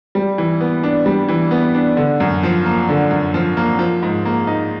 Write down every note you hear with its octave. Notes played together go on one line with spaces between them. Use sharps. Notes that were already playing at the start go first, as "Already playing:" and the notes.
G3
E3
B3
D4
G3
E3
B3
D4
D3
F#2
F3
A#3
D3
F#2
F3
A#3
F3
G#2
A#3
D#4